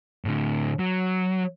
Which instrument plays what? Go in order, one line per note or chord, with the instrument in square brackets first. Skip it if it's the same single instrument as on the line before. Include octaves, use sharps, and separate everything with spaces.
[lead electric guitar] A2 D3
F#3